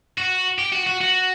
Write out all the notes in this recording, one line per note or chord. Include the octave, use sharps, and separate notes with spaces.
F#4
G4
F#4
F#4
F#4